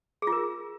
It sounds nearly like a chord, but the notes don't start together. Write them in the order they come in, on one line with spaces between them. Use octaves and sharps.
G#4 F4 A#4